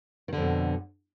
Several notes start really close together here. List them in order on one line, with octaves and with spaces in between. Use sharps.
D#3 D3 F2 B2